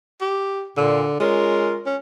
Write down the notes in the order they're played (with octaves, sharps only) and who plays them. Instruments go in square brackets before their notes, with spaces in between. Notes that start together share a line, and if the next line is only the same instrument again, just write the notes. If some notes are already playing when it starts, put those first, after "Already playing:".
[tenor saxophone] G4
[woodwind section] A#2 [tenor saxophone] D3
[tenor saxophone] G#3 [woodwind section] C#4 F4 A#4
[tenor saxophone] C#4